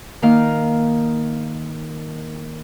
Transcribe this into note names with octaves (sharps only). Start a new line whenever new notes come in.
D#3 A#3 D#4 F5